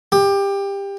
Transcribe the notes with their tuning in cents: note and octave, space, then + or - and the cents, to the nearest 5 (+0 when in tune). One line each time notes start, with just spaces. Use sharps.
G4 +20